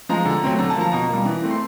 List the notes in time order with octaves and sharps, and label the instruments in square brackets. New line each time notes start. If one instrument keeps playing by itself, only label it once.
[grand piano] F3 G#3 A#5
D3
F#3 A3 C4
D3 A#5
A5
F3 A#3 A#5
B2 A#5
G3 A#3
E3
A3 C4
C6